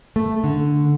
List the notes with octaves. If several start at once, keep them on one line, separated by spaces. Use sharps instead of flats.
A3
D3